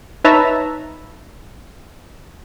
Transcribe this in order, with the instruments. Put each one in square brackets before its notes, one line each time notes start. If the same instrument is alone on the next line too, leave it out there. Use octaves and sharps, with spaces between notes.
[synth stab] D#4 B4 C#5 E5 A5 A#5